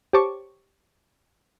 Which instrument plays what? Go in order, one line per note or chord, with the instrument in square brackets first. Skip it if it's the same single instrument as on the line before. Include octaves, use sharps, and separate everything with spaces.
[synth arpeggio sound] G4 C5 C#5 A5 C#6 D6